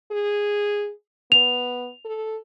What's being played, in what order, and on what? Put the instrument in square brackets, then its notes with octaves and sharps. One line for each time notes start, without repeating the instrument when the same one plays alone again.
[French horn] G#4
[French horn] B3 [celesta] F7
[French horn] A4